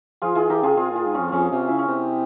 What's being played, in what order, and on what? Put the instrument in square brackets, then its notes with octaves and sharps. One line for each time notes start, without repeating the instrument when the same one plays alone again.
[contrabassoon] F3 [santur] F4 G#4
[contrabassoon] E3 [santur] F4 G#4
[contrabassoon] E3 [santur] G4 A#4
[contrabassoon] C#3 [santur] F4 G#4
[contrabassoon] C3 [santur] F4 G#4
[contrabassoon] A#2 [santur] F4 G#4
[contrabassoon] G#2
[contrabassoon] F2 [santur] C#4 F4
[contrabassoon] F2 [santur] C#4
[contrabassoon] C3
[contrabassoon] C#3 [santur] E4
[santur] C#4
[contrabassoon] C3 [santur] C4